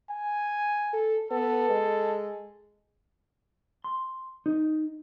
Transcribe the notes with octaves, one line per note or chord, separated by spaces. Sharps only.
G#5
A4
B3 A4
G#3
C6
D#4